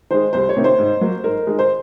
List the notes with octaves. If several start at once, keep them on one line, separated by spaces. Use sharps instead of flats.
D#3 G#3 C5
C2 C5
C#5
C3 D#3 A#3
C5
G#2
F#3 A#3
G#2 A#4
D#3 G#3
C5